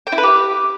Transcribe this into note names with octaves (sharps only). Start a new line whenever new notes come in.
G5
E4
B4
G4